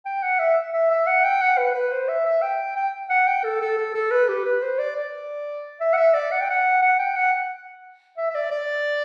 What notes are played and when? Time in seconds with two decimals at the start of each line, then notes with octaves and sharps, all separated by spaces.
0.05 G5
0.23 F#5
0.39 E5
0.73 E5
0.90 E5
1.07 F#5
1.24 G5
1.41 F#5
1.58 B4
1.75 B4
1.92 C5
2.08 E5
2.26 E5
2.42 G5
2.76 G5
3.10 F#5
3.27 G5
3.44 A4
3.61 A4
3.78 A4
3.95 A4
4.11 B4
4.28 G4
4.45 B4
4.62 C5
4.79 D5
4.96 D5
5.80 E5
5.93 F#5
5.97 E5
6.14 D5
6.31 F#5
6.41 G5
6.50 F#5
6.82 F#5
6.99 G5
7.16 F#5
8.17 E5
8.30 E5
8.35 D5
8.51 D5